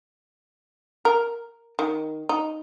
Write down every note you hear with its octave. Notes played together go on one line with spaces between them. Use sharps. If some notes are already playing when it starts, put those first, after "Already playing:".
A#4
D#3
D#4